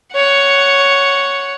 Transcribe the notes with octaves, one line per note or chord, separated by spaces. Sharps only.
C#5 F#5